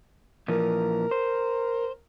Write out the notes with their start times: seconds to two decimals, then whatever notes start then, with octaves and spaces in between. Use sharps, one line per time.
0.48 A#2 E3 F3 A#4
1.11 C5